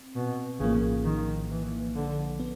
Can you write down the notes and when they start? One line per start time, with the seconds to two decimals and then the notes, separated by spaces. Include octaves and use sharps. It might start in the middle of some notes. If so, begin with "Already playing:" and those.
Already playing: C4
0.16 B2
0.60 A#1 A2 C#3 F3 A#3
1.05 D#3
1.51 E3
1.95 D3
2.40 B3